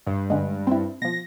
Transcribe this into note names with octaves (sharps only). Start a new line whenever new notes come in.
G2
F#2 D3 G#3
C4 E4
B2 F3 A#6